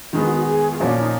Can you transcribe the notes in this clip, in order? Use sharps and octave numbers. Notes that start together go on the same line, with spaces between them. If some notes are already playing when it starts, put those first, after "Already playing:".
D#3 G#3 B3 F4
F#4
F#4
G#4
F4
A#2 F3 A#3 C#4 F#4
F4
D#4